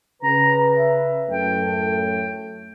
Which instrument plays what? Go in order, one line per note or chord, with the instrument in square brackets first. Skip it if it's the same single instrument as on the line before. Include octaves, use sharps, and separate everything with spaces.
[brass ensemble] C#3 B4 [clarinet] A#5
[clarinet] E5
[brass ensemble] F#2 A2 A3 [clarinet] G5